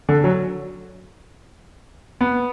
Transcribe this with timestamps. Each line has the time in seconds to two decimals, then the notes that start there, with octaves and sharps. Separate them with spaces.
0.09 D3
0.24 F#3
2.21 B3